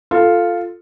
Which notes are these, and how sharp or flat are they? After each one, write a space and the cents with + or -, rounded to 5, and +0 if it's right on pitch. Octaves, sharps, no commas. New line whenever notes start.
F4 +0 A4 +5